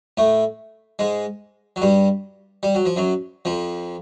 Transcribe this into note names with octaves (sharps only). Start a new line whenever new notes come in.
A2 A3
G#2 G#3
F#3
G2 G3
G3
F#3
F3
F#2 F#3
F2 F3